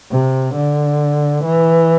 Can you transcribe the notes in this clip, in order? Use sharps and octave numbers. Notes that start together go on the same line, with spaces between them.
C3
D3
E3